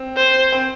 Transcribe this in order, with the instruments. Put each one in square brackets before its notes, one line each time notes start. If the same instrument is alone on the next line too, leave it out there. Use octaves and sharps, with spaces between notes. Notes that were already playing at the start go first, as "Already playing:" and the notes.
Already playing: [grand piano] C4
[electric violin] C5
[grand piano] C4